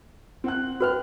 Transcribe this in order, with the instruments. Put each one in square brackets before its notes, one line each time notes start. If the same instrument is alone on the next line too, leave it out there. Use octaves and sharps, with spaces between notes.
[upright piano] C4 F#5 F#6
[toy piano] F#4 B4 [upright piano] G5 F6